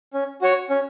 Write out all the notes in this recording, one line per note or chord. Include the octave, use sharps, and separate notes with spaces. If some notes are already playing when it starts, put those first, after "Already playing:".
C#4
F#4 C#5
C#4